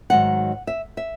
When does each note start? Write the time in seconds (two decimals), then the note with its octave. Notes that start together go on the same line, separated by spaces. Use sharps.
0.10 G#2 D#3 F#3 F#5
0.67 E5
0.97 E5